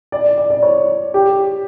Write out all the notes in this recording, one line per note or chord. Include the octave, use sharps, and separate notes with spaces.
D5
D5
D5
D5
C#5
G4